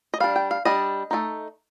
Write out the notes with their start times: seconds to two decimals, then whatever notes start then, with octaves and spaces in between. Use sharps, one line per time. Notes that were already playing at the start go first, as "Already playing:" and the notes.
0.14 D#5
0.20 G3 D4 F5
0.36 G5
0.51 F5
0.65 G3 D4 D#5
1.11 A3 C4 D#4